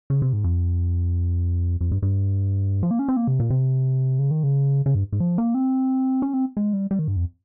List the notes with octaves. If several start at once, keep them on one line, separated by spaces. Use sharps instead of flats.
C#3
C3
G#2
F2
F2
G2
G2
F3
A#3
C#4
C4
A#3
C3
A#2
C3
C#3
D#3
C#3
C#3
G2
G#2
F3
A#3
C4
C#4
C4
G#3
G3
G3
D#3
G2
F2